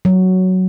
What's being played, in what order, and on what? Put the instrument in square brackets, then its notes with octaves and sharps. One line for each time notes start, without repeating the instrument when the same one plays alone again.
[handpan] F#3